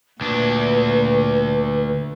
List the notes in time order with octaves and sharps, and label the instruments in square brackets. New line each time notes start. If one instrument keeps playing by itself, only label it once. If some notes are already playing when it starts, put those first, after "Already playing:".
[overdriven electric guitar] D2 D4 [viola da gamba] A#2 [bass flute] B4